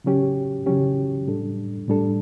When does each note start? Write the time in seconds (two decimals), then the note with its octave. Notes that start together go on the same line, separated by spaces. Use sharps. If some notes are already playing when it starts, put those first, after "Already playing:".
0.04 C#3 F#3 C#4 G4
0.66 C#3 F#3 C#4 G4
1.27 A2 G3 D4 A4
1.88 A2 G3 D4 A4